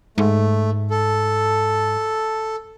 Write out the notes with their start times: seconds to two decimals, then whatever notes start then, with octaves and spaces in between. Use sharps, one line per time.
0.18 G#2 A3
0.91 A4